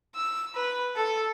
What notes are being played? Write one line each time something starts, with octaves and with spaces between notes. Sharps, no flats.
E6
B4
A4